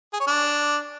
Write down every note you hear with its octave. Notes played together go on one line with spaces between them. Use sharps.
G#4
C#5
D4